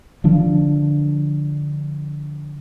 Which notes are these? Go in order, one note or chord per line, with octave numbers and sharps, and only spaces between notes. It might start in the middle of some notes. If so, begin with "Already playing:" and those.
D3 F3 D4